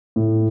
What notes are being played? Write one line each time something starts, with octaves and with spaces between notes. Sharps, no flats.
A2